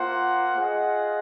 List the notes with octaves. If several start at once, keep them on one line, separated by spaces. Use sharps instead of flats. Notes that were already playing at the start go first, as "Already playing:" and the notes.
Already playing: A#3 F4 C5 F#5
F4 G#4 D#5 F#5